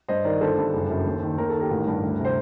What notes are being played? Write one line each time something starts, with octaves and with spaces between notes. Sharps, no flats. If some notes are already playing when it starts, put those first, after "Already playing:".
G2 C5 D#5
D#3 A#4 D5
G1 A4 C5
G2
F#1
F#2
D#2
D#3
D#2 A#4
A4
D#3
G4 A#4
A1
G2
D2
C3
C5